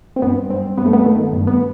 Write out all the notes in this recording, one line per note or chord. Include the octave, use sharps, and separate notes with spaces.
C4
G2 B3
G2 C4
G2 B3
A3
B3
D#3 A3
G2
B3